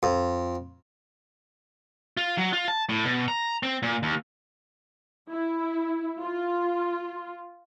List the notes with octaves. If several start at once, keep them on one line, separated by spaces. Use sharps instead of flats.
F2
F4
F#3
F4
A5
A2
B2
A#5
C4
A#2
D#2
E4
F4